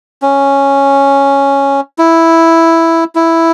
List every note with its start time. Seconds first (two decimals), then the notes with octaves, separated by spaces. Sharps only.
0.22 C#4
1.99 E4
3.15 E4